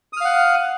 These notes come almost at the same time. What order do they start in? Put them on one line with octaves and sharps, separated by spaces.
D#6 F6 F5 F#5